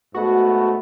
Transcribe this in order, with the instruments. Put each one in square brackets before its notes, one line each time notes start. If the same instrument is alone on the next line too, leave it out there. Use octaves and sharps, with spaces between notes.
[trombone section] G#2 A3 B3 [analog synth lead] F#4